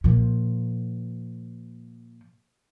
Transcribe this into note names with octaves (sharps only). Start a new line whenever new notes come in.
A#2 F3